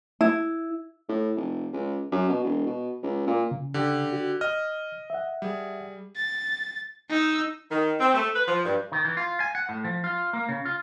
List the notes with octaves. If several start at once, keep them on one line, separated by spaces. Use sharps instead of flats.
E4
A2
F1
C#2
F#2
B2
E1
B2
C#2
A#2
C#3
D3 G4
F#4
D#5 F6
E5 F#5
G3 G#4
A6
D#4 E6
D#3
C4
A3
B4
F3
G2
D#3
E3
F4
G#5
F#5
A2
F3
F4
A#3
C#3
F4